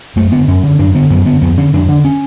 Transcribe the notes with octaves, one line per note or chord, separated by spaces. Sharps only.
F#2 A3
D3 B3
F#2 C#4
D3
F#2 D4
D3 B3
F#2 B3
D3 B3
F2 B3
D3 C#4
F2 D4
D3 D4
C#4